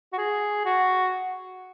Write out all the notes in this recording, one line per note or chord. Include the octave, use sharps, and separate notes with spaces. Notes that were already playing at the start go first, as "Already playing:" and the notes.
F#4
G#4
F#4